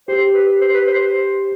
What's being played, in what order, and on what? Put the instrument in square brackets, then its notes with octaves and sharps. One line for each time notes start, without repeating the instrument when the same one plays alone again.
[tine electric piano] G4 [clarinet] C5
[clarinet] B4
C5
B4
C5
C5